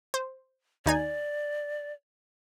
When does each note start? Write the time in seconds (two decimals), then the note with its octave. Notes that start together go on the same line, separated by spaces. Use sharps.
0.14 C5
0.86 D#2 D#4 D5 G#5